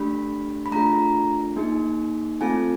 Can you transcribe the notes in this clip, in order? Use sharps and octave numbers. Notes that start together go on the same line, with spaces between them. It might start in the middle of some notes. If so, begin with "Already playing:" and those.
Already playing: A3 D4 G4 B5
B5
A3 D4 F4 G#4 A#5
A#3 D#4 G#4
A3 C4 F4 A4 G#5